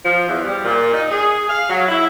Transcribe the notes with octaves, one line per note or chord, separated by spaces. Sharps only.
F3
E2
G3
A#2
D#4
G#4
F5
F#3
E4